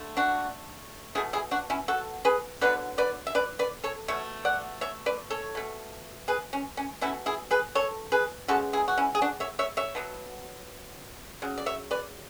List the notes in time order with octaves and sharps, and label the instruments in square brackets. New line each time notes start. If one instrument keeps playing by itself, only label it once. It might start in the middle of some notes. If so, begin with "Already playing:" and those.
Already playing: [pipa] D3 A3
D4 F#4
B2 A3 E4 G#4
E4 G#4
D4 F#4
C#4 E4
F#4 A4
G#4 B4
D3 F#3 B3 B4 D5
B4 D5
E5
B4 D5
B4 D5
A4 C#5
B2 A3 C#5 E5
D5 F#5
C#5 E5
B4 D5
A4 C#5
B2 A3
G#4 B4
C#4
C#4
B2 A3 C#4 E4
E4 G#4
G#4 B4
A4 C#5
G#4 B4
C#3 G#3 B3 F#4 A4
E4 G#4
F#4
C#4 E4
G#4
D4 F#4
C#5 E5
C#5 E5
C#5 E5
B2 F#3 B3
C#3 F#3
D5
C#5 E5
B4 D5